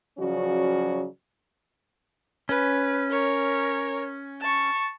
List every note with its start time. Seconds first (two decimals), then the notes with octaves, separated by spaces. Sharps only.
0.19 C#3 F3 F#3 C#4 F#4 D5
2.49 C#4 B4
3.10 A#4 C#5
4.41 A5 C#6